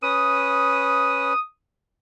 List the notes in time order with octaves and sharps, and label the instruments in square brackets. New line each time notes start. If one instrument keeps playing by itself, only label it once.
[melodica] C#4 B4 [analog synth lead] D#6